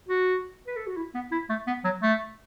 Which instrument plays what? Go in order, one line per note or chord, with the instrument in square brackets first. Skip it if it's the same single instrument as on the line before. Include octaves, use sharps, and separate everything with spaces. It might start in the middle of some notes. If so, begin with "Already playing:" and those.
[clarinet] F#4
B4
A4
F#4
E4
B3
E4
A3
B3
F#3
A3